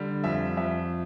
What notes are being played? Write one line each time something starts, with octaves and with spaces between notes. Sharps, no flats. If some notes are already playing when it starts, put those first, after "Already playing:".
Already playing: D3 G3
F2 E5
F2 E5